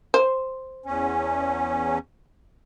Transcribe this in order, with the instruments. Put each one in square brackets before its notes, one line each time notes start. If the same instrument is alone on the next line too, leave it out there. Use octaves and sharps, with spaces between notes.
[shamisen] C5
[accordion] E2 C#4